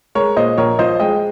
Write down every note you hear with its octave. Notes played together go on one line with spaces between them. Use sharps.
G#3 A#4 C#5
A#2 C5 D#5
A#1 A#4 C#5
F3 C5 D#5
G#3 D#5 G5